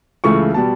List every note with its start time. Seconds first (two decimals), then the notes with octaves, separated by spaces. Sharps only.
0.24 C#2 C#3 E3 A3 C#6
0.54 B2 G3 A5